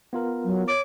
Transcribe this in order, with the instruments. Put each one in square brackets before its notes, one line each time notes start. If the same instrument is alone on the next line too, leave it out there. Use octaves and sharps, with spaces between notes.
[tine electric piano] B3 F4 A#4
[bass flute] F#3
[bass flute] C#5 [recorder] D6